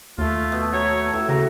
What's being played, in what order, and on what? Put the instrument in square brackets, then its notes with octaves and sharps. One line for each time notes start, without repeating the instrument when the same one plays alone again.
[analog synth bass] D#2 [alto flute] A3 [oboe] F4
[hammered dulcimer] B2
[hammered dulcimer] F#4 A#5 C#6 [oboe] C#5
[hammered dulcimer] A2 F#4 [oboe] E6
[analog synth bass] C#3 [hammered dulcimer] F#4 [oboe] A#5